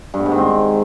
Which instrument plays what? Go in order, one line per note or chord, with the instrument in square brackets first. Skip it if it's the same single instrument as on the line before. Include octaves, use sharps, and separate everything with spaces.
[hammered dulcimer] G2
B3
G#2
D#3
C4